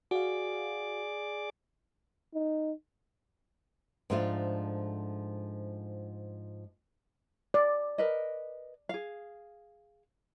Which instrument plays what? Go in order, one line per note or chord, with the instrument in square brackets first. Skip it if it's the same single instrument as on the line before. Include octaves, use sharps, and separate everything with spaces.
[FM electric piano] F#4 F5 [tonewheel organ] G#4 D5 D6
[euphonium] D#4
[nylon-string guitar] G#2 F3 A3 D4 F4
[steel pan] D5
[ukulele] A#4 B4 D#5
G#4 F5